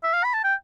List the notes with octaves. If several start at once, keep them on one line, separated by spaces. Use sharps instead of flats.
E5
F5
B5
A5
G5